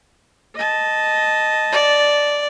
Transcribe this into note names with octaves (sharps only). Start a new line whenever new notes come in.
D#5 A5
D5